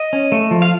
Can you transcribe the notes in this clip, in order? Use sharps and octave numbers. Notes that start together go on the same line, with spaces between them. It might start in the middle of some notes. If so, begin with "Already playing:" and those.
Already playing: D#5
C#4
A3
F3
F5